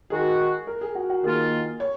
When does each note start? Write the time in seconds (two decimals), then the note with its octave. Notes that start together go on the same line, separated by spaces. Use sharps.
0.10 D#3 G#3 D#4 F#4 G#4
0.67 A#4
0.81 G#4
0.95 F#4
1.10 F#4
1.24 D#3 A#3 F4 G#4
1.80 C#5